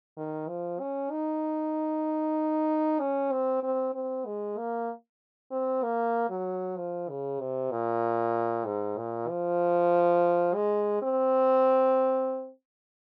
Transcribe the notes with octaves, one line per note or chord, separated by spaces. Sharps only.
D#3
F3
C#4
D#4
C#4
C4
C4
C4
G#3
A#3
C4
A#3
F#3
F3
C#3
C3
A#2
G#2
A#2
F3
G#3
C4